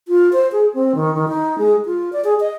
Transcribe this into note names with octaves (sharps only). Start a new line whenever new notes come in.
F4
C5
G#4
C4
D#3
D#3
D#4
G#3
F4
D5
G#4
D#5